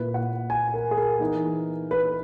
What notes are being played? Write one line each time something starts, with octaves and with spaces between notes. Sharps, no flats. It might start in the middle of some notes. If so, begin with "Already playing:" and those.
Already playing: A#2 A#3 E4 B4
F#5
G#5
A#4
G#4
A#4
E3 B3 D#4
B4